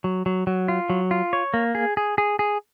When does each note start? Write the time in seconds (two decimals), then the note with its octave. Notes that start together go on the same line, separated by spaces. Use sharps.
0.04 F#3
0.26 F#3
0.47 F#3
0.68 F4
0.90 F#3
1.11 F4
1.33 C#5
1.54 A#3
1.75 G#4
1.97 G#4
2.18 G#4
2.39 G#4